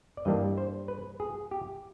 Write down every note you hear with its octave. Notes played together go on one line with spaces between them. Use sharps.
D5
G2 E3 G3 A#3 D4 D#5
C5
B4
G#4
G4